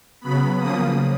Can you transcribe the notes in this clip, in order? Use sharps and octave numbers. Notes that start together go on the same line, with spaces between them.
C#3 F#3 B3 B5
C#3 F3 A#3 D#6